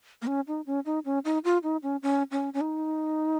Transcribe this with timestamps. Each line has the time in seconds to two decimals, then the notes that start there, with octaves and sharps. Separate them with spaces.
0.22 A#3
0.27 C#4
0.48 D#4
0.66 C#4
0.86 D#4
1.05 C#4
1.25 D#4
1.44 F4
1.63 D#4
1.83 C#4
2.03 C#4
2.31 C#4
2.54 C#4
2.61 D#4